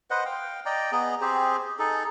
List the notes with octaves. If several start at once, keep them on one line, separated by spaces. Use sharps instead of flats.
B4 C5 D#5 F#5
F5 G5
D5 D#5 G5 A#5
B3 G#4 D#5 A#5
C4 G4 G#4 C5
D#4 G#4 A4